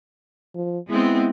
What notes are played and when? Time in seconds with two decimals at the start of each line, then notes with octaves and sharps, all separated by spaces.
0.55 F3
0.90 G#3 B3 C4 E4